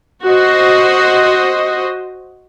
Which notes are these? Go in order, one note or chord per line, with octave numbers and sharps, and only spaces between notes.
F#4 C5 D#5